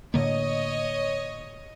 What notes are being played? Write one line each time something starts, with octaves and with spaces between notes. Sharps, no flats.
A2 D3 A#3 C#5 D#5